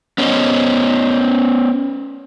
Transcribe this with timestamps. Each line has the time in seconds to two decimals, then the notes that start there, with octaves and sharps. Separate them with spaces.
0.18 B3 C#4 F#4 C5 D#5